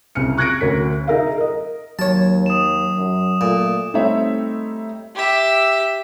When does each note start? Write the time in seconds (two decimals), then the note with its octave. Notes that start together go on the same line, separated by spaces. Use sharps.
0.15 C2 C#3 F6 C#7
0.37 C#6 F#6 G#6 A#6 C#7 D7
0.61 D2 C#4 A#4 B6
1.07 D#4 G#4 A#4 E5 F5
1.38 A#4 D#5
1.99 D#2 F#3 C#5 A5
2.46 D#6 E7
2.97 F#2
3.41 A#2 A3
3.94 G3 A3 C4 D#4 C#5 E5
5.15 G4 E5